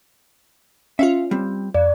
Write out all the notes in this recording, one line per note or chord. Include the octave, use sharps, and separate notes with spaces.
C#4 F4 E5 F5
G3 C4
F2 D5